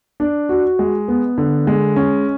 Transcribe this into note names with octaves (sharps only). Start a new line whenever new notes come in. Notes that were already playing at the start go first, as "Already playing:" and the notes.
D4
F#4
G#3
B3
D3
G#3
C#4